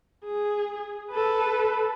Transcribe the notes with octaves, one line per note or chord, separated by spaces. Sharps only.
G#4
A4 B4